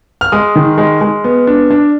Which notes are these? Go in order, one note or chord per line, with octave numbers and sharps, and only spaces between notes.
F6
G#3 D#6
D#3
G#3
G#3
B3
D4
D4